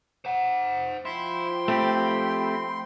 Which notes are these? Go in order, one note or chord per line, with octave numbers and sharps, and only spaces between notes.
C5 F#5
F3 E4 G5 C6
A3 C4 G4 B5